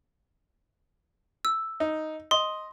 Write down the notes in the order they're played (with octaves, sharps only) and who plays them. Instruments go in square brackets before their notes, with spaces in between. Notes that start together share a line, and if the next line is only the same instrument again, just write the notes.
[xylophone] E6
[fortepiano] D#4
[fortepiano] D#5 [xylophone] C6